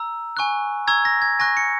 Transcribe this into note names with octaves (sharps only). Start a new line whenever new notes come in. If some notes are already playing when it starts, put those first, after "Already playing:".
Already playing: A#5 E6
G#5 C#6 F#6
A#5 C#6 E6 G#6
A#6
G#6
G#5 C#6 F#6 A#6
C#7